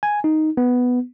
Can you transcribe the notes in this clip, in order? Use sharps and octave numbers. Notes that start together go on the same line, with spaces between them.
G#5
D#4
B3